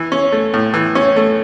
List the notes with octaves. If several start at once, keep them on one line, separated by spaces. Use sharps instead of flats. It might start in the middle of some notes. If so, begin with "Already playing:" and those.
Already playing: E3
C#4
A3
A2
E3
C#4
A3